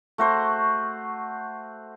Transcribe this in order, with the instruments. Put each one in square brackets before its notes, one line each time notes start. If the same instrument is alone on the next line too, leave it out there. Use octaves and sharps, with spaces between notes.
[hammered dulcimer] A3 F#4 C5